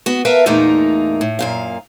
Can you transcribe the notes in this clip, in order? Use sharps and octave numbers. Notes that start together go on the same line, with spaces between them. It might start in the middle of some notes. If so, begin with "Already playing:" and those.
B3 F#4
A#4 B4 E5 F5 A5
E2 A#2 A3 A#3 D#4
A2
F#2 A#2 F5